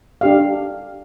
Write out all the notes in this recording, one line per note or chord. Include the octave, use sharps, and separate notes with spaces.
D4 G4 F5